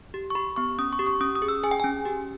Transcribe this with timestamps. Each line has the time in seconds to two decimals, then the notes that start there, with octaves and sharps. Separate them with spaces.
0.14 G4
0.30 C#6
0.35 G4 B5
0.56 B3 C#6
0.79 C#4 D#6
0.93 C#6
0.99 G4
1.07 C#6
1.21 C#4 D#6
1.35 D#6
1.42 G#4
1.48 E6
1.64 G#4 G#5
1.71 G5
1.80 C#4 G#5
2.06 G4